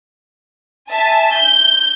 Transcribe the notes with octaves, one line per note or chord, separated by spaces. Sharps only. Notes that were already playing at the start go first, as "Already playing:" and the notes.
E5 G#5 A5
G6